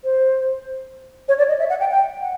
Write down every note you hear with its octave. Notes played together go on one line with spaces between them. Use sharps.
C5
C#5
D5
D#5
E5
F#5
G5
G5
F#5